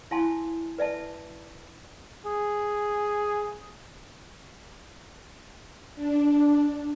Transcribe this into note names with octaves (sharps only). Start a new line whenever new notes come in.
E4 F5 G#5 A5 C6
B4 D5 E5 A5
G#4
D4